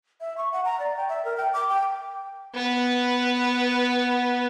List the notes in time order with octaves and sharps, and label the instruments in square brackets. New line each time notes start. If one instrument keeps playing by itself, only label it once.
[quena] E5
C#6
F#5
A#5
D5
G5
E5
A#4
G5
D6
G5
[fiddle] B3 B4